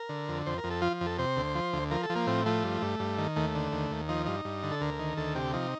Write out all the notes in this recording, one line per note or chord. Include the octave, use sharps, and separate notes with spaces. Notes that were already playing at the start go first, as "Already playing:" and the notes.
Already playing: A#4
D3
F2
F2 C5
A#4
F2
A4
F3 F4
F2
A4
C3 C5
D2
F3
D2
F3 A#4
A4
F3
A#3
A2 C4
F3 A3
G2
G2
G2
D#3
D#2 A3
D3
D#2
D#2
F3 D#4
G2 D#4
G2
D3
A4
D2 A#4
D#3
D2 A4
C3 G4
F3 D#4